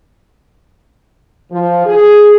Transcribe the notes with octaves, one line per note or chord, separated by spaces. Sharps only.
F3
G#4